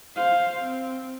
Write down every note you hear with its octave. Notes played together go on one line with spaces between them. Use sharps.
C5 F5
C4